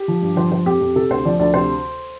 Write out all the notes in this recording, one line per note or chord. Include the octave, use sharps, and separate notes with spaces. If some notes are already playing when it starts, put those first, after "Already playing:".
Already playing: G4
F3
G2
F3 C5
F3 C5
F2 G4
F2
C3 A4
D2 C5
F3 D5
D2 D5
C3 C5